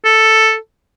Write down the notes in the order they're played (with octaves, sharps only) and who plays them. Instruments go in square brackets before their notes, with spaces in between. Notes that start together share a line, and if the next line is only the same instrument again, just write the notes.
[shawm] A4